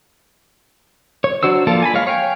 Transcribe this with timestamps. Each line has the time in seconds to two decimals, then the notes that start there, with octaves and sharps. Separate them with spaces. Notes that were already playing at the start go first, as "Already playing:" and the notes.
1.24 C#5
1.43 F#3 D4 F#4 C5 E6
1.67 F3 A#3 F4 A4 D5
1.82 G#5 A5 B5
1.94 G#3 C#5 F5
2.07 C#5 F5 G5 G#5